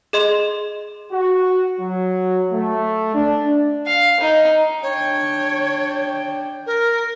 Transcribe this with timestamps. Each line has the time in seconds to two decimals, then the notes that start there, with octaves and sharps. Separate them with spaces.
0.13 G#4 D#5 C6
1.12 F#4
1.80 F#3
2.51 A3
3.14 D4
3.87 F5
4.20 D#4
4.83 D4 C#5 G5
6.66 A#4